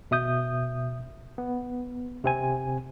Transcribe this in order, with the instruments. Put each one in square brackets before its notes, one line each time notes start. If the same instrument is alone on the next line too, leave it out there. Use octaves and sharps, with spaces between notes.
[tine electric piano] B2 E5 D#6 G6
B3
C3 C4 G#5